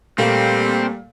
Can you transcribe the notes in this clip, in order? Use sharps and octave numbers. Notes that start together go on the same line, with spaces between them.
A#2 G3 A3 A#3 C4